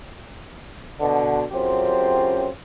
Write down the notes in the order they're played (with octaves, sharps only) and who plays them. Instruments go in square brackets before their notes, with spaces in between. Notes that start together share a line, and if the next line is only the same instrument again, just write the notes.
[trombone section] B2 D3
F#2 C#3 C4 F4 G4 C5